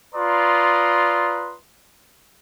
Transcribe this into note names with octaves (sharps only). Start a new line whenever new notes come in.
F4 B4 D5 A#5 C6 D#6